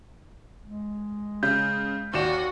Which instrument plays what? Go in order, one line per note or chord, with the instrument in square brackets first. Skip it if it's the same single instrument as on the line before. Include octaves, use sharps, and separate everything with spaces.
[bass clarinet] G#3
[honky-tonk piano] C#3 [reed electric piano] G6
[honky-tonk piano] D#2 D5 E7 [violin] F#4